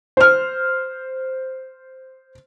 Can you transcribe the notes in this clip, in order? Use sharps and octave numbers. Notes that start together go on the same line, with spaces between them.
C5 F6